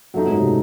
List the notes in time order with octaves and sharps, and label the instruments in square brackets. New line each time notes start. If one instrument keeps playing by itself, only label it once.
[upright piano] F#2 [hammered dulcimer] F#3 A3 D#4
[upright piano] G#2
C3